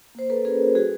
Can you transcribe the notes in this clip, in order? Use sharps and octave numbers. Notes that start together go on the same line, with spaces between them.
A#3 C5
A#3 A4 B4
C#4 G#4 A#4
F#4
G3 F#4 G#4